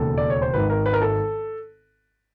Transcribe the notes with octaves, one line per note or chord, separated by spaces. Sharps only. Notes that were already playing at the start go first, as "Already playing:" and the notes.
Already playing: E1 D#2 C#3 A4
D5
C#5
C5
G#1 G#2 D#3 B4
A#4
B4
A#4
A4